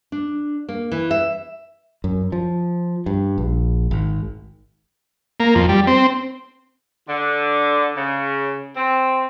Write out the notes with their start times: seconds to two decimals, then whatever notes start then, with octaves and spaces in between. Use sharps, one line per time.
0.12 D4
0.69 A#3
0.92 E3
1.11 E5
2.04 F#2
2.32 F3
3.06 G2
3.38 A#1
3.91 G#1
5.40 A#3
5.55 F2
5.69 G3
5.87 C4
7.08 D3
7.96 C#3
8.76 C4